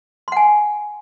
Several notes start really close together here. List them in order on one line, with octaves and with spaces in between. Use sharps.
C6 F#5 G#5